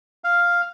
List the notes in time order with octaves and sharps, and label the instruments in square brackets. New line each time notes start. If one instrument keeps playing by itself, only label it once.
[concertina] F5